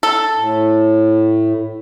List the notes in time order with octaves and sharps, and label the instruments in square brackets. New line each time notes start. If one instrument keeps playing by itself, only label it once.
[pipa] A4
[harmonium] A2